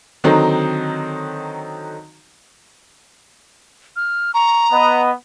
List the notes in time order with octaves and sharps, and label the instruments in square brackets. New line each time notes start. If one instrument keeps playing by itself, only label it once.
[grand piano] D3 D#3 F#3 C4 D#4
[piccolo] F6
[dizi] A#5 [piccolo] C#6
[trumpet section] B3 [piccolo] D#5